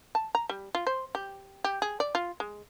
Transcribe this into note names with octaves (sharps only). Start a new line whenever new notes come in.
A5
A#5
G3
F4
C5
G4
G4
G#4
D5
F4
G#3